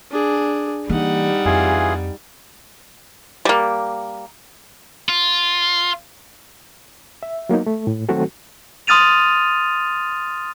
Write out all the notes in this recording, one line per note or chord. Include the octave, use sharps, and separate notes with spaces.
D4 G#4
E3 G3 A#3 D#4 F#5
F2 E3 F4 G#4
G3 A#3
F4
E5
F#3 A#3 B3 D#4
A3
A2
D#3 F#3 A3 C4 F#4 A4
C6 D#6 F6 A6 D#7 F7